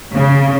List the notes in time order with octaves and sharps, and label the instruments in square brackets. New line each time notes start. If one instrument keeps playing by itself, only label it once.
[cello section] C#3